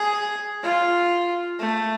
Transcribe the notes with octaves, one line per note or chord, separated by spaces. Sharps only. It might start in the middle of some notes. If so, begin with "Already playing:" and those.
Already playing: G#4
F4
A3